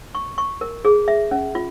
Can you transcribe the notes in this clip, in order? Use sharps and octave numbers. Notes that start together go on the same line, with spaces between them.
C#6
C#6
A#4
G#4
E5
C#4
F4